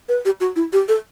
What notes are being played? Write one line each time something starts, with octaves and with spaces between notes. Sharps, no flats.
B4
G4
F#4
E4
G4
A4